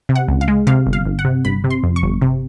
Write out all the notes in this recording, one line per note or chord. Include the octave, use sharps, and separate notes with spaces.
C3
F#5
C#2
F5
G#3
C3 F5
G1
F5
G1
F#5
C3
G1 B5
C3
C6
F2
C#6
G1
C3